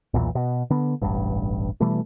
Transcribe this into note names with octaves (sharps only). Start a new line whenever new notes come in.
B1 E2 A#2 E3
B2
D3 B3
E1 A1 G2
B2 E3 G3 A3